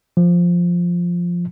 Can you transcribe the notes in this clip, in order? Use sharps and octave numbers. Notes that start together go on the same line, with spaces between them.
F3